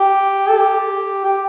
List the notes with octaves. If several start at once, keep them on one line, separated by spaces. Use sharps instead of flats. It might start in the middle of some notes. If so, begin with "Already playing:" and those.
Already playing: G4
A4
G4
G4